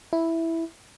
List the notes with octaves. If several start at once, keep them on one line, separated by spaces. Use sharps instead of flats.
E4